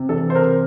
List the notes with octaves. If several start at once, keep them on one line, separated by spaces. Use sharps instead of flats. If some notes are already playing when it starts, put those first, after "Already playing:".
Already playing: C3
E3 A4
C5
C3 A#4